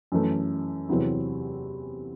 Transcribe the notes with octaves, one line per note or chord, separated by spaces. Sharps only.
F#2 E3 A3
E2 C3 F#3 C4 E4